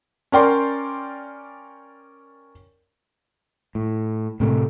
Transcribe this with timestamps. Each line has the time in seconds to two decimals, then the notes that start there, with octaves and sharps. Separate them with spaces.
0.32 C#4 A#4 D5 G5 C6
3.75 A2
4.40 A2 C3 A3